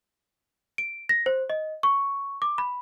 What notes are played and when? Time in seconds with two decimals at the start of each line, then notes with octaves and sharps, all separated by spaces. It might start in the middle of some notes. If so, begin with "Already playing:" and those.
0.78 D7
1.09 A#6
1.26 C5
1.50 D#5
1.83 C#6
2.42 D6
2.58 B5